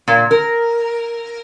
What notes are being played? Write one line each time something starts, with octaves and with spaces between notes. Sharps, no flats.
A#2
A#4